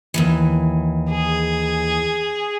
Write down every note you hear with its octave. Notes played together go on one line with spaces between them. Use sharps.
D#2 G#2 E3
G#4